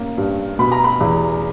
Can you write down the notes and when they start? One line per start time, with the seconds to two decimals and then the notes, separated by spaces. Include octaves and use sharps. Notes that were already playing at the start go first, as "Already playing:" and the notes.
Already playing: A#3 C#4
0.18 G2
0.59 B2 B5
0.72 A#5
0.84 B5
1.01 E2